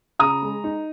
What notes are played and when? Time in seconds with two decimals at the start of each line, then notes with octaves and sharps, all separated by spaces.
0.19 C#3 A#5 D#6
0.42 G#3
0.64 D#4